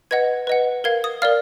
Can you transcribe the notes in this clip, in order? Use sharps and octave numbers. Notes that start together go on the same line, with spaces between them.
B4 D#5 F#5 G#6
B4 D#5 F#5
A#4 F5 G#6
D#6
A#4 D5 F5 F6